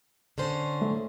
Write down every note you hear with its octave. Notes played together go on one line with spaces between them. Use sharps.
D3 C#4 C5
A3